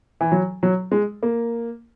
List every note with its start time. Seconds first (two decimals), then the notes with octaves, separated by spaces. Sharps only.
0.21 E3
0.32 F#3
0.63 F#3
0.92 G#3
1.23 A#3